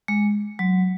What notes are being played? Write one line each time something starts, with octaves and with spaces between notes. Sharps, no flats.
G#3
F#3